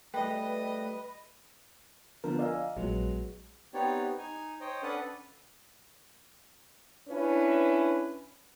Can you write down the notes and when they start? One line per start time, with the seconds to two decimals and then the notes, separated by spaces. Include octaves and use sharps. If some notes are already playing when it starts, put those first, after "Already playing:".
0.14 G3 A3 B4 D#5 G5
2.24 D3 F3 B3 A#4
2.39 D5 D#5 F5 G#5 A#5 E6
2.77 A#1 F#3 G#3 B3
3.74 B3 C4 D#4 G4 C#5 D5
4.18 D#4 G#5
4.61 C5 C#5 D#5 G5
4.83 C#4 D4 A4 B4 F#5 D#6
7.08 C#4 D4 E4 B4